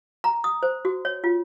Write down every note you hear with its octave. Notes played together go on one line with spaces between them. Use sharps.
A#5
D#6
C5
F#4
C#5
F4